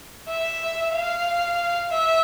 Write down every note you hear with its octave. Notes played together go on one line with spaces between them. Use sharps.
E5
F5
E5